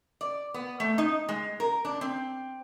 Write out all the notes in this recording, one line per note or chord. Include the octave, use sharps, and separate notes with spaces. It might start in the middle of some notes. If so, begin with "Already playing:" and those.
D5
B3
A3
D#4
G#3
A#4
D4
C4